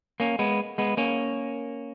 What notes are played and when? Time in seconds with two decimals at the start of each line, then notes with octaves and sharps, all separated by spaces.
0.20 A#3 C#4
0.39 G#3 B3
0.78 G#3 B3
0.97 A#3 C#4